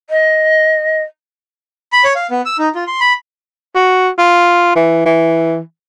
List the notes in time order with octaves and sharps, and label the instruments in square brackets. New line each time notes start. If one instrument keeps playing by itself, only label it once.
[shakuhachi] D#5
[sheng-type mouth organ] B5
C#5
F5
B3
E6
D#4
F4
C6
B5
[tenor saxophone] F#4
F4
E3
E3